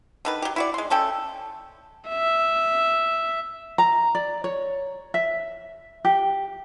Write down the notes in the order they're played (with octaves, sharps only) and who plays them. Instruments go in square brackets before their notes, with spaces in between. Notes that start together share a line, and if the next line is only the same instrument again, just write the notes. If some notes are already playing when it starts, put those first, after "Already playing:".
[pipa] D3 D#3 B4
F#3 G4
E4 F#4 D5
G#3 C6
A3 C#4 A4 G5
[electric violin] E5
[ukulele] A#5
D5
C#5
E5
G4